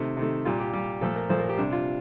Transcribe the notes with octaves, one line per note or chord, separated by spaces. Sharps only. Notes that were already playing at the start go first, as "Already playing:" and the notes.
Already playing: C3 D#3 A3
C3 D#3 A3
A#2 G3 F4
G4
A#2 G3 G4
A#2 F3 A3 A4
A#4
A#2 F3 A3 C5
A#4
G4
C3 G3 D4
F4